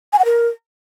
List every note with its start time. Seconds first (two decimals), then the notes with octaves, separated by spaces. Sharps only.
0.13 G#5
0.19 F#5
0.25 A#4